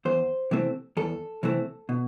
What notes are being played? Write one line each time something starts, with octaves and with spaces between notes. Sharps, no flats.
E2 C5
C3 E3 A3 C4
E2 A4
C3 E3 A3 C4
B2